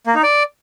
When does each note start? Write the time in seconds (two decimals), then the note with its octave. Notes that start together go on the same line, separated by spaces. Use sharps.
0.06 A#3
0.15 D#4
0.23 D5